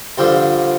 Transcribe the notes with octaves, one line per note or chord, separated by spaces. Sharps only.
G2 D3 F3 C5